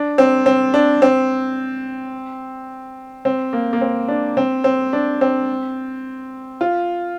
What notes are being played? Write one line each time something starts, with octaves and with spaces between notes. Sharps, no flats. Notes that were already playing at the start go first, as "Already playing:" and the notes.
Already playing: D4
C4
C4
D4
C4
C4
A#3
A#3
C4
D4
C4
C4
D4
C4
F4